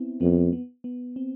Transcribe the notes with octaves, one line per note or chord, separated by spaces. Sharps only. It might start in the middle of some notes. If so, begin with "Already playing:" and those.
Already playing: B3 C4 E4
F2 B3
B3
B3
C4